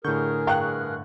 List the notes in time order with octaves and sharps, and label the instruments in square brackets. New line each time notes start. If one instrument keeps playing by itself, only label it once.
[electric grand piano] A2 D3 [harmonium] G#4 A#4 [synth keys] C#6 G6
[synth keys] G2 C#6 F#6 [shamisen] F5 G5 A#5